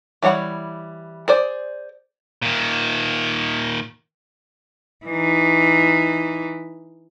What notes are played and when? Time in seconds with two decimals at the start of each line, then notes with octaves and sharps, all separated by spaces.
0.22 E3 G3 C#5 F#5 B5
1.28 G#4 C5 D5
2.42 A#2 D#3
5.06 E3 D#4